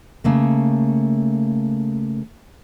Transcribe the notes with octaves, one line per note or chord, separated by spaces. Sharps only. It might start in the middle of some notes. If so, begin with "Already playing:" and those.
C#3 A3 A#3